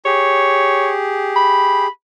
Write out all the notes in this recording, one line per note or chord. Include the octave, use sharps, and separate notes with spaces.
G4 G#4 C#5
B5